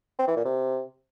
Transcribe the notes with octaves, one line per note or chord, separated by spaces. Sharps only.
C4
E3
A#2
C3